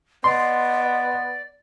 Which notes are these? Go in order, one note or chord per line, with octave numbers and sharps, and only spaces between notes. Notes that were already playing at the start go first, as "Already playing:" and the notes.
B3 D5 D#5 C6